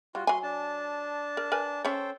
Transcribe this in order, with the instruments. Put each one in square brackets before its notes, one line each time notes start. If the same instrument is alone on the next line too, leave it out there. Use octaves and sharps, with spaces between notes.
[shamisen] G3 [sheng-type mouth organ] F4 F#4
[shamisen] F#3 G#5 [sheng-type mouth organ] C6
[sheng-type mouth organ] D4 A5
[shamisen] A#4
A#4 B4 G#5
[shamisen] C#4 C#5 [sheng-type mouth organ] A4 C5 G5